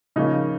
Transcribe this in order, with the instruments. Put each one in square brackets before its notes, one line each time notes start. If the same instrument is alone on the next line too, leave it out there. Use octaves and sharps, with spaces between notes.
[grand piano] C#3 F3 A#3 C#4 D#4